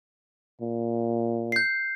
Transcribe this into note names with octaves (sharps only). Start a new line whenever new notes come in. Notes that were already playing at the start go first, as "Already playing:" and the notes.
A#2
G6 C7